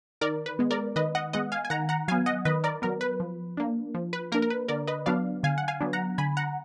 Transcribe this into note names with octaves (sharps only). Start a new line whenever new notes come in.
D#3 A#4 D5
B4
G#3 B3
A#4 D5
D#3 B4 D#5
D#5 F#5
G#3 B3 D#5 F#5
F5 G#5
G#5
D#3 F#5 A#5
F#5 A#5
F#3 B3 F5 G#5
D#5 F#5
D#3 B4 D#5
A#4 D5
F#3 B3 A#4
B4
F3
A#3 D4
F3
B4
A#3 D4 A#4
A#4
B4
D3 A#4 D5
B4 D#5
F#3 B3 D4 D5 F5
D3 F5 G#5
F#5
F5 G#5
F#3 B3 D4
F#5 A#5
D3 G#5 B5
F#5 A#5